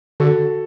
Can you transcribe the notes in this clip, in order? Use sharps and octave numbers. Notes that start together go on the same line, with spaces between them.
D3 F#4 A4